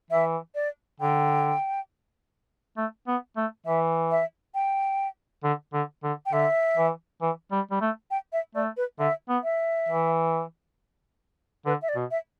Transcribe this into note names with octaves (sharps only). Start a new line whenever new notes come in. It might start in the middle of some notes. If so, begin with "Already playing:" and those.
E3 E5
D5
D3 G5
A3
B3
A3
E3 E5
E5
G5
D3
D3
D3
G5
D3 E5
E3
E3
G3
G3
A3
G5
E5
A3 D5
B4
D3 E5
B3
E5
E3
D3 B4
E5
D5
B2
E5